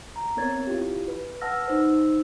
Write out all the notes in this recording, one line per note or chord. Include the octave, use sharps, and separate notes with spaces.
A#5
B3 C4 A#4 C#5 G#6 A6
E4 F4 G4
B4
B4 F#5 A5 E6 F6 A#6
D#4 C5 E6